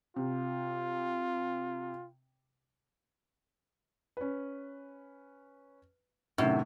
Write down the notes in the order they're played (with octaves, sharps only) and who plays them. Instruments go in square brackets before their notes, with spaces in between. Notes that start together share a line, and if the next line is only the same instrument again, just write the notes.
[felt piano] C3 [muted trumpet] F4
[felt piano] C#4 B4
[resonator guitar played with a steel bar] F#2 [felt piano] A2 C3 D#3